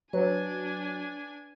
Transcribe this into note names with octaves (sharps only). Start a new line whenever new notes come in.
F#3 D4 B4 G#5